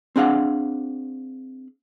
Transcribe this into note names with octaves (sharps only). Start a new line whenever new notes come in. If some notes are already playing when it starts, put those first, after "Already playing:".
C4 D4 G#4 F5 F#5